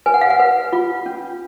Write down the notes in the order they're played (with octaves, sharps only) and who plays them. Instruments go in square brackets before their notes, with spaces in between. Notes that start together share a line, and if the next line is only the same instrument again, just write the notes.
[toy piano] B4 G#5
F#5
F5
F#5
B4
F4
C#4